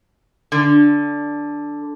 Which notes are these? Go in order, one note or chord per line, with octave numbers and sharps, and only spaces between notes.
D3